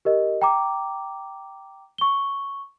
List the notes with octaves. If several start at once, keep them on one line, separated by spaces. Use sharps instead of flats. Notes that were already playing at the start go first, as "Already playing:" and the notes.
G4 A#4 D#5
G5 A#5 D6
C#6 G7